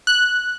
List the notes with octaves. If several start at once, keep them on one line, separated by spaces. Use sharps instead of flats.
F#6